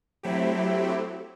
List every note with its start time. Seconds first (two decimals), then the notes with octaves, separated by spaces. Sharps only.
0.23 F#3 A3 C4 E4 G4